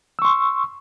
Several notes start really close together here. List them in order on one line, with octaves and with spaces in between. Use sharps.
E6 C#6 C6